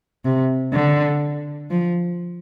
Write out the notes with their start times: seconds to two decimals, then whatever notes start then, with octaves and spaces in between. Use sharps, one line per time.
0.25 C3
0.73 D3
1.70 F3